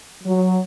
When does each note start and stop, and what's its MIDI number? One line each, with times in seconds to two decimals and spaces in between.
0.24 0.58 54